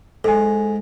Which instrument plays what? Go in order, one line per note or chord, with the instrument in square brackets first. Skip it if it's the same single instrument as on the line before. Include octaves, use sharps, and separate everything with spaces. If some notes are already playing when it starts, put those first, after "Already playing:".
[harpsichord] G#2 [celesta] A4 G#5